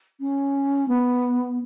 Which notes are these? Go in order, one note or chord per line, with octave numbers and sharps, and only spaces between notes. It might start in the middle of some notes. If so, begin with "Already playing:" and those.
C#4
B3